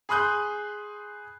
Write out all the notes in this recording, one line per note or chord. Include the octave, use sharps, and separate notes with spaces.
G#4 B5 C6 D#6 F#6 G6